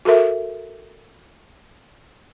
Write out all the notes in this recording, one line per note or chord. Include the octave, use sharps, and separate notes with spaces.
F#4 A4 A#4 E5